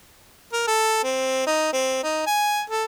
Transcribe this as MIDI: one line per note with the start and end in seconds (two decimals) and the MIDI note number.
0.53 0.63 70
0.67 0.99 69
1.03 1.43 60
1.46 1.71 63
1.73 2.01 60
2.03 2.22 63
2.27 2.61 80
2.70 2.84 69